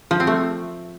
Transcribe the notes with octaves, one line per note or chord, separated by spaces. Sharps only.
F3
C4
A3